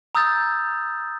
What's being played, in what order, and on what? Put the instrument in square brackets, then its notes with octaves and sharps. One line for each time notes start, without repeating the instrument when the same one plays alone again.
[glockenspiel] A#5 D#6 E6 G6 A6